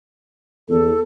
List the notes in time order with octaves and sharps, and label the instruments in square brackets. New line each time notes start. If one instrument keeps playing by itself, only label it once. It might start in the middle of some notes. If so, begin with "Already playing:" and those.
[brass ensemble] E2 [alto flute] A4